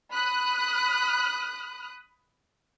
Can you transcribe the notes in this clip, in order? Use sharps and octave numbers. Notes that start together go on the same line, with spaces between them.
B5 D#6 F#6